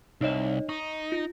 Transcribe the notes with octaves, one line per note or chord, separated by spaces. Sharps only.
C2 D#4 C#5 D#5
D#4 C#6
F4